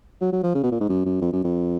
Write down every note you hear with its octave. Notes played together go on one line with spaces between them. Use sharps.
F#3
F#3
F3
C#3
B2
A#2
G#2
F#2
F#2
F2
F#2
F2